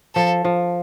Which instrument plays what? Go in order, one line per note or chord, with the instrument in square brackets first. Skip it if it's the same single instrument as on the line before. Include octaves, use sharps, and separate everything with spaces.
[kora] F3 [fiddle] A4
[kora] F3